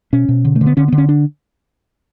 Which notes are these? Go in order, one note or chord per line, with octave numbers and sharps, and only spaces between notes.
B2 C#4
B2
D3
A3
D3
B3
D3 C#4
D3 B3
C#4
D4